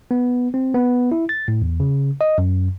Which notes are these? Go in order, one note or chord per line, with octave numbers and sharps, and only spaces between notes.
B3
C4
B3
E4
A6
A2
E2
C#3
D#5
F#2